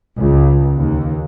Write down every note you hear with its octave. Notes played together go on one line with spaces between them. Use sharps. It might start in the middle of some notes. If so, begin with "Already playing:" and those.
C#2
D#2